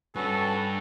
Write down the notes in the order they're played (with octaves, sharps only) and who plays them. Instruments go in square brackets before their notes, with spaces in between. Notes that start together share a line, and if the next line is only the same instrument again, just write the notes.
[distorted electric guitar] G2 [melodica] C#4 F#4 B4 [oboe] A4